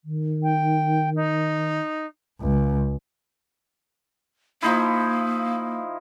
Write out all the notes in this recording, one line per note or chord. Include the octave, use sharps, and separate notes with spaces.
D#3
G5
D#4
C#2
F3 A#3 D#4 E4